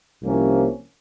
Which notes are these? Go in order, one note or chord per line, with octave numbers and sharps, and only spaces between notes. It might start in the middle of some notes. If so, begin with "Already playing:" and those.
C2 C3 F3 A#3 C#4